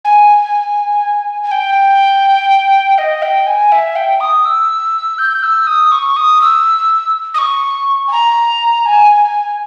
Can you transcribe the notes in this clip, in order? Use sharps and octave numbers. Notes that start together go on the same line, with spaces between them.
G#5
G#5
G5
D#5
G5
G#5
E5
G5
D#6
E6
G6
E6
D#6
C#6
D#6
E6
D#6
C#6
G#5
A#5
G#5